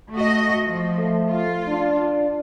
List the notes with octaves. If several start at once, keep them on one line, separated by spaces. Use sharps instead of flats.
A3 F#4 D#5
F3
A3
F4
D4